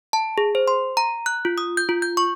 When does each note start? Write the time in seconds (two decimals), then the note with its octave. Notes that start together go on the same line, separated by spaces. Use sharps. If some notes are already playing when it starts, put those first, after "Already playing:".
0.13 A5
0.38 G#4
0.55 C5
0.68 C6
0.97 A#5
1.26 F#6
1.45 F4
1.58 D#6
1.77 G6
1.89 F4
2.02 G6
2.17 C#6